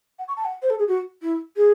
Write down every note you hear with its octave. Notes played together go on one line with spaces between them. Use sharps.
F#5
C#6
A5
F#5
C5
A4
G#4
F#4
E4
G#4